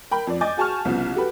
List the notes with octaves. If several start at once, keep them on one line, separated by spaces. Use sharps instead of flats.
A#4 G5 B5
F2 D5
D#5 G#5 D6 G6 A6
F#4 G#4 G#5 A5 C#6 F6
C2 C#3 F3 B3
F#4 G4 A4 B4